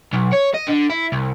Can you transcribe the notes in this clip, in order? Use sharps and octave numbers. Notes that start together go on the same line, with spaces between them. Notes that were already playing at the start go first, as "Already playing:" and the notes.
B1
C#5
D#5
D3
E4
C2